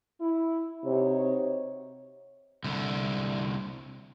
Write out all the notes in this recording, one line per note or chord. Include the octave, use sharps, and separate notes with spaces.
E4
C3 D#4 F#4 C#5
C2 D3